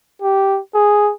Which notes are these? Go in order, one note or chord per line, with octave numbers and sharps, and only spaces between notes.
G4
G#4